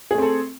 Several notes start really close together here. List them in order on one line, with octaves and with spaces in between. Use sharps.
G#4 A3 C4 A4